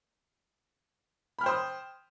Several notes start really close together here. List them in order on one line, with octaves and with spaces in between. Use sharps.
B5 F6 G5 C5 D#6